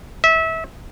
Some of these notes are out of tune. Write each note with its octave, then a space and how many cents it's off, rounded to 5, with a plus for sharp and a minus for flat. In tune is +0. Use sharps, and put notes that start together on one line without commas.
E5 -25